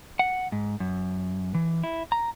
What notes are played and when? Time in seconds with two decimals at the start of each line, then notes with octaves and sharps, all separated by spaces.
0.19 F#5
0.52 G#2
0.80 F#2
1.55 E3
1.84 E4
2.12 A#5